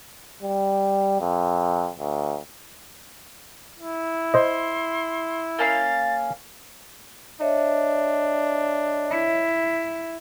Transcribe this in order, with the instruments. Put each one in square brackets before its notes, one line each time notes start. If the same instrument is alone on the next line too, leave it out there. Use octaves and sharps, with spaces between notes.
[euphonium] G3
F2
D2
[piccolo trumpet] E4
[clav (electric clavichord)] C5 D#5 [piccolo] C6
[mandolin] A#3 C#4 F5 [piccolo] A6
[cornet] D4 [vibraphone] C#5 D#5 E5
[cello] E4